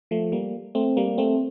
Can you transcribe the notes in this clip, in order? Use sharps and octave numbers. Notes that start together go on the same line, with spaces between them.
F3 A3
G3 A#3
A3 C4
G3 A#3
A3 C4